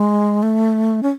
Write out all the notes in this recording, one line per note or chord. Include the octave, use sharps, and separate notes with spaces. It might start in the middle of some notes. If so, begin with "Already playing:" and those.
Already playing: G#3
A3
C#4